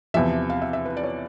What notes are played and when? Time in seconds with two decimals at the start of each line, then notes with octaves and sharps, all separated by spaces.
0.14 E2 C3 F3 E5
0.50 F5
0.62 E5
0.73 E5
0.85 B4
0.97 D5
1.03 C#5